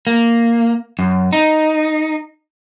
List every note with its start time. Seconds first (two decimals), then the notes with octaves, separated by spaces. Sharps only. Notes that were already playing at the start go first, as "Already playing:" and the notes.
0.07 A#3
0.99 F#2
1.33 D#4